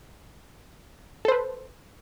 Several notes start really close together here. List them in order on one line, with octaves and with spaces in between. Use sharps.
A4 C5 B4